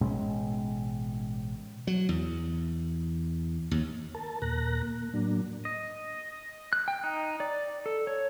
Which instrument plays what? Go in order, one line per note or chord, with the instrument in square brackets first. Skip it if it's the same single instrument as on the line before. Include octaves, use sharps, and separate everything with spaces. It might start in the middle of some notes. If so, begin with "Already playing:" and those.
[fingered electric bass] A1 B2 G#3 C#4
[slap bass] F#3
E2
D#2
[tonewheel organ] A#4 A5
D#2 A#2 A#4 F#6 A#6
A#3
A2 F#3 A#3 D4
[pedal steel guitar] D#5
F#6
G5
D#4
D5
A4
C#5